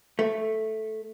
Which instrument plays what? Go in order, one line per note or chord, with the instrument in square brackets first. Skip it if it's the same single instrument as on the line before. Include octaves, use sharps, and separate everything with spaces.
[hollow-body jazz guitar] A3